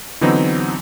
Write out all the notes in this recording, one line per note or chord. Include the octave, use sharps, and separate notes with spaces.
D3 E3 F#3 B3 C4 D#4